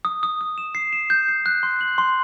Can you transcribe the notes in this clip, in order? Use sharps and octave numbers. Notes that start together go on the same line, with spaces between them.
D#6
D#6
D#6
E7
C7
E7
G6
C7
F#6
C6
F#7
C6